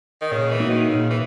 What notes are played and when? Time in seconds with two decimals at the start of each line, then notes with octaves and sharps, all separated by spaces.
0.21 D#3
0.31 A#2 C#3
0.50 E3
0.60 A#3 D#4 F#4
0.70 D#3
0.89 A#2 C#3
1.10 E3